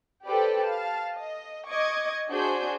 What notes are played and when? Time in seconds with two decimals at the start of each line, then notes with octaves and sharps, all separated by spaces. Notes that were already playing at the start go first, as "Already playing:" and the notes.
0.25 G4 A4 B4 C5 D5 G5
0.63 F5 A5
1.17 D#5
1.70 D#5 C#6 D6 G#6
2.29 D4 F#4 G#4 C5 G#5 G6